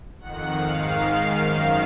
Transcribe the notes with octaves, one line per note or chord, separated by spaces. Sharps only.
F2 D#3 F#5
G#2 D#3 F5
G#2 D#3
F#2 D#3